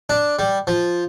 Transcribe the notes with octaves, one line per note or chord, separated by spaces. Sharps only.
D4
G3
F3